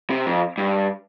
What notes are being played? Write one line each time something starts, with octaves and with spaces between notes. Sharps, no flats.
C3
F2
G2